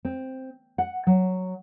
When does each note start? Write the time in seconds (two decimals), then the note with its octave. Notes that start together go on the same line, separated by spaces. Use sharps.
0.05 C4
0.78 F#5
1.07 F#3